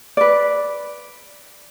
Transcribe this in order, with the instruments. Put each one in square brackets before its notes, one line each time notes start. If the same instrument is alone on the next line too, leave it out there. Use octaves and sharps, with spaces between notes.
[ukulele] B4 D5